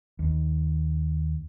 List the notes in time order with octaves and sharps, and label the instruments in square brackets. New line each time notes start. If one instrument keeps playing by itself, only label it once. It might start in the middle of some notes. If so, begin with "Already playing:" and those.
[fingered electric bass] D#2